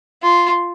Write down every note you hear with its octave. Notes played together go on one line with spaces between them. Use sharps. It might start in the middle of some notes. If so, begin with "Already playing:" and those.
F4